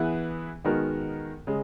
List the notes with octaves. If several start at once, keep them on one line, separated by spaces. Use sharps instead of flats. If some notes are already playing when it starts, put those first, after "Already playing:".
Already playing: E3 B3 E4 G#4 B4
D#3 G#3 B3 F#4 A#4
C#3 G#3